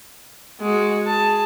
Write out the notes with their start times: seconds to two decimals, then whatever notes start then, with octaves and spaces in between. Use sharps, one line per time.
0.60 G#3 F#4
1.07 G#4 A5